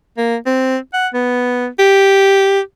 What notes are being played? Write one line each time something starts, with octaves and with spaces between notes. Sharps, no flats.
A#3
C4
F#5
B3
G4